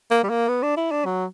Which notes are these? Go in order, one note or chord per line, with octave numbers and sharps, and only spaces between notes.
A#3
G3
A#3
B3
D4
E4
D4
F#3